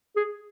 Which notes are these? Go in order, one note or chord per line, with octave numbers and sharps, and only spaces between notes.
G#4